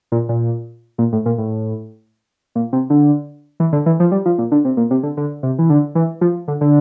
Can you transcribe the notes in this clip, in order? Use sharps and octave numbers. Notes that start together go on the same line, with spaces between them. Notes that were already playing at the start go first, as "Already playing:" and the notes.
A#2
A#2
A#2
A2
A#2
A2
A#2
C3
D3
E3
D3
E3
F3
G3
F3
A#2
D3
C3
A#2
C3
D3
D3
C3
E3
D3
E3
F3
D3
D3